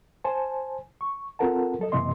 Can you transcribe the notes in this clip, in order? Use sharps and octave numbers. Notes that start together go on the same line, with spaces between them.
C5 G#5 A5
C#6
C4 F4 A4 A#4 F#5 A5
F#3 A4 D#5
F#2 C3 E3 A#3 D#5 C6